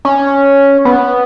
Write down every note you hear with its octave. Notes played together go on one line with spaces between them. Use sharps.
C#4
B3